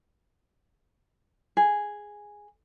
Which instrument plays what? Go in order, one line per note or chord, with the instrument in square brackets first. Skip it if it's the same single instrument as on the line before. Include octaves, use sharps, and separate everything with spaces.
[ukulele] G#4